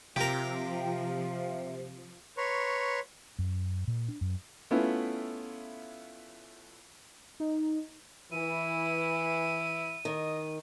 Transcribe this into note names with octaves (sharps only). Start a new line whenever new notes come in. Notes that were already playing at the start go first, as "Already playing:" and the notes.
C3 F3 F4 G4 A#4
B4 C#5 A#5 C6 C#6
F#2
A#2
D4
F#2
A3 B3 C#4 E4 F4
D#4
E3 E4 D#7
D#3 D#5